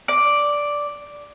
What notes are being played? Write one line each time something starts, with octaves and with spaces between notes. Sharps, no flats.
D5